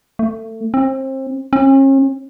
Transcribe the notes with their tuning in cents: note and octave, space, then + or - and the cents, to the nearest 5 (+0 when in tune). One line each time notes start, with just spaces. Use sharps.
A3 +25
C4 +30
C#4 -40